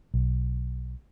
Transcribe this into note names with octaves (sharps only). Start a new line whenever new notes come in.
B1